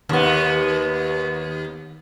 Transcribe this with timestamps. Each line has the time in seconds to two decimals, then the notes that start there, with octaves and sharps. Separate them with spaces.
0.09 D#2 B3